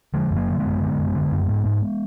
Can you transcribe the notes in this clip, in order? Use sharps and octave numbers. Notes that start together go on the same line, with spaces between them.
D3 F3 G#3
F#2
F#3 A#3
D3
G#3 B3
F#2
D3
F#2
D3
F#2
G#2
G#2